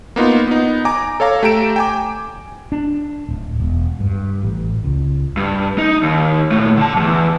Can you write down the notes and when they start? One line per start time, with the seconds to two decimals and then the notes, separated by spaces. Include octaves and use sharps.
0.16 A#3 B3 D#4 F4
0.47 B3 D#4
0.85 G#5 A#5 D6
1.20 A4 C#5 F5 A#5
1.43 A3 G4 A#5 D7 E7
1.76 G5 G#5 D6
2.72 D4
3.28 D1
3.60 E1
4.00 G2
4.43 A1
4.84 C#2
5.37 G2
5.78 D#4
6.03 D#2
6.51 A#2 A3
6.77 D3 A5
6.97 E2 G2